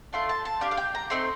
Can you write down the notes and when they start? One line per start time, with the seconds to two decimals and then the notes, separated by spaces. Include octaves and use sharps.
0.13 A3 D4 F4 C6
0.29 A5
0.45 A5
0.61 D4 G4 F5
0.71 F5
0.77 G5
0.95 A#5
1.10 A3 C4 D#4 C6